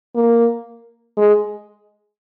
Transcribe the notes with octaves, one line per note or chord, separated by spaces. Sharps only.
A#3
G#3